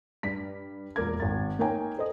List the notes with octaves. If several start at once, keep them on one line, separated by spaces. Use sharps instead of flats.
G2 B6
E1 A#2 A#4 D6 G#6
G#1 A6
A#3 D#4 A#4 C#5 G5 G#5
A4 C5 D#5